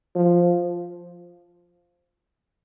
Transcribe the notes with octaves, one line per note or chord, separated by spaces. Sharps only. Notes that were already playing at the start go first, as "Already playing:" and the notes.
F3